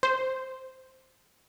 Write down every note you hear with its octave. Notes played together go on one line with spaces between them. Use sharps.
C5